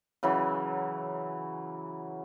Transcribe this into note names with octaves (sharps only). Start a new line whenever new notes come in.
C#3 E3 F#3